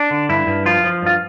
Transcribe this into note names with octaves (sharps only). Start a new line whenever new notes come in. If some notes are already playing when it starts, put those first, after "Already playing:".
Already playing: D4
D3
G2 E4
G2
F3 F4
F3
G2 F4